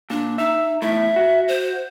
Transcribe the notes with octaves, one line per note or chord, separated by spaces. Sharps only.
A#2 D4
D#4 E5
E2 A2 E5
F#4
C5